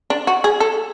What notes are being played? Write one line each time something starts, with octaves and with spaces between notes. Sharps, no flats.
D4
F#4
G#4
A4